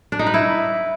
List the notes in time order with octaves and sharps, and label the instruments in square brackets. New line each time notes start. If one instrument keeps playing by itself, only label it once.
[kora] D4
D#4
B4
E4